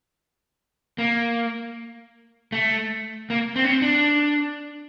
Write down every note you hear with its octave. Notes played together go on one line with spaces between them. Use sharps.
A#3
A3
A#3
C4
C#4
C4
D4